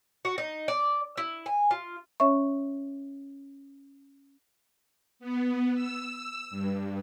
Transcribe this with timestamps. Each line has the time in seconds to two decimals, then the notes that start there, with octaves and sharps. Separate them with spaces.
0.25 F#4
0.38 D#4
0.68 D5
1.17 E4
1.46 G#5
1.71 F4
2.20 C#4 C#5 E5 C#6
5.19 B3
5.74 E6
6.50 G2